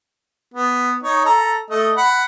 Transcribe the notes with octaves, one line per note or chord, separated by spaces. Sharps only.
B3
D#4 C#5
A4 A#5
A3 D#5
F#5 B5